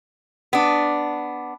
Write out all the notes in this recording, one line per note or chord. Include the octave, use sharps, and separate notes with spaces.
B3 D4